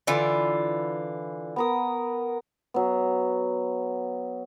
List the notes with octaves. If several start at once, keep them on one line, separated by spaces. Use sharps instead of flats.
D3 E3 F4
B3 A#4 D#6
F#3 B3